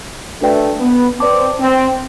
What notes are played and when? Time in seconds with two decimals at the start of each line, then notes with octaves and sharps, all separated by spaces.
0.41 A3 D4 F#4 B4 D5 G5
0.80 B3
1.19 C4 B4 D5 A5 D6
1.59 C4